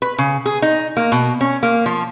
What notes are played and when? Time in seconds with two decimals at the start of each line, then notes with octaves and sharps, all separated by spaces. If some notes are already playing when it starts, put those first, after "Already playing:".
0.02 B4
0.18 C#3
0.46 G#4
0.62 D#4
0.97 A#3
1.12 B2
1.41 C#4
1.63 A#3
1.86 F3